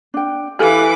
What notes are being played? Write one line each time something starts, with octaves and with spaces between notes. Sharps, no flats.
D4 G5
E3 G4 A4 F5 G#5 D6